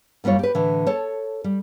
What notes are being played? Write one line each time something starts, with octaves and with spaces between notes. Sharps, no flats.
F#2 G3 A#3 F4 C#5
G4 B4
A2 D3 E3
A4 C#5 A5
G3